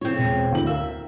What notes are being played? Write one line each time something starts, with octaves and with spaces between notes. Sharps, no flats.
A2 C#3 F3 C4 C#5
E1
D2 A2 F#7
A#4 E5 F5